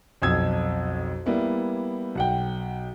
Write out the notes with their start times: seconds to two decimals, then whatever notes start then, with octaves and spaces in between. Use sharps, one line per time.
0.22 B1 F2 D#6 E6 G#6
1.26 G3 A#3 B3 E4
2.15 B1 F#5 G5